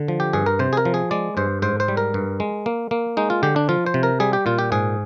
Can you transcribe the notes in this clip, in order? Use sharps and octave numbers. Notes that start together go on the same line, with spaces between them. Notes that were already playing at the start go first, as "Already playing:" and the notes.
Already playing: D3
F3
G4
G2 G#4
A#4
C3 C5
G#4
A#4
F3
G#4
G#3 D5
G2 C5
G#2 C5
C5
G3
A#4
G2
G#3
A#3
A#3
G#3 D#4
F4
D3 G4
D4
F3 F4
C5
C3
A#4
G3 G#4
G4
A#2 F4
G4
G#2 G#4